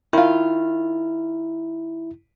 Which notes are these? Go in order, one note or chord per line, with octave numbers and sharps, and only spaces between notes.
D#3 E4 F4